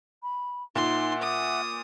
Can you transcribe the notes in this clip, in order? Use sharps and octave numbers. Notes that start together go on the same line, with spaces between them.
B5
A#2 D#4 E5 F#5 C6
D6 D#6